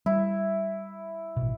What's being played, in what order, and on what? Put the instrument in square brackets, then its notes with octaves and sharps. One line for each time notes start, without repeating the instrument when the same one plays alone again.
[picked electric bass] G3 [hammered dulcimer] E4
[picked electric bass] A1 B2